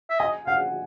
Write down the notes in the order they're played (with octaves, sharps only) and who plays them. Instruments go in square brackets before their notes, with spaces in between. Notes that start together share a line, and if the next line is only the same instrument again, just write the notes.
[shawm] E5
[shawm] D#5 [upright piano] G#5
[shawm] F5 [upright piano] F#5